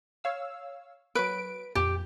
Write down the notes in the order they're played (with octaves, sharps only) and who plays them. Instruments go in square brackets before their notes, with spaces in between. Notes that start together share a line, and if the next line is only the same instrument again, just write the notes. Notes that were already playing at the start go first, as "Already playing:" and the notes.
[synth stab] C#5 F5 E6
[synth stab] F#3 D7 [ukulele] B4
[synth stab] F2 A#2 [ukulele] G4